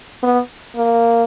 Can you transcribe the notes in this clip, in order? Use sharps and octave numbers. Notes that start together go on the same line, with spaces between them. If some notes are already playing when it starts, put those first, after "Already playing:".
B3
A#3